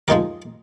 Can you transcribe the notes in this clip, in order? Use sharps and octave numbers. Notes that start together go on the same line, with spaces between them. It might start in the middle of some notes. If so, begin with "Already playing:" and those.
F3 G#3 D#4 G4 A#4